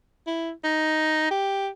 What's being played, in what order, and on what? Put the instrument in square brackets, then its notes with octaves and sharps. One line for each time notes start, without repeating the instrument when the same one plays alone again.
[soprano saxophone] E4
D#4
G4